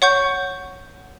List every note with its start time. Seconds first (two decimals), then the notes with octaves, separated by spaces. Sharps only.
0.02 C#5 F#5 C#6 G6